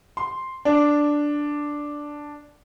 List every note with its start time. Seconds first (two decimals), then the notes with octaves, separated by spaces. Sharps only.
0.17 C6
0.65 D4